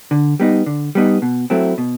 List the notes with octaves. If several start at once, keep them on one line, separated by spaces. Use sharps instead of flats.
D3
G3 B3 D#4
D3
G3 B3 D#4
B2
F#3 A3 C4 E4
B2